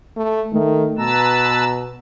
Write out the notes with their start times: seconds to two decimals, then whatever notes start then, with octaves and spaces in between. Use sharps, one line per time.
0.17 A3
0.53 D#3 A3
0.98 B2 B4 A5 A#5 E6